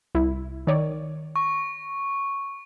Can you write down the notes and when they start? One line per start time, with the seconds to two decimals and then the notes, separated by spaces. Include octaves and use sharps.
0.15 C2 E4
0.67 D#3 C#5 D5
1.36 C#6